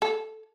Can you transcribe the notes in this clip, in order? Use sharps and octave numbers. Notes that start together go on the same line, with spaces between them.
A4